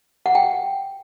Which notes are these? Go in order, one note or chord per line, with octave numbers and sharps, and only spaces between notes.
F#5
G5